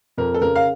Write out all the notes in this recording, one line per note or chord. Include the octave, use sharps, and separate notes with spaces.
F2 A#4
A4
C#3 A#4
F5